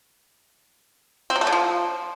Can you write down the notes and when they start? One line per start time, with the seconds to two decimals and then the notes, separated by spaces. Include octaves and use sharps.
1.30 C4
1.36 F#3
1.41 A3
1.47 D3
1.52 F3